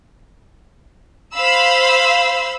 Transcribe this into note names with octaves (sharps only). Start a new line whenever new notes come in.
C5 F5 B5 E6